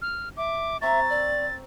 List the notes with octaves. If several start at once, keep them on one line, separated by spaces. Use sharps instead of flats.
F6
E5 D6
C4 E5 A#5 C#6 A6
D5